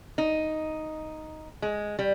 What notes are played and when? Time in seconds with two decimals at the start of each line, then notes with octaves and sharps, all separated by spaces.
0.18 D#4
1.62 G#3
1.99 G3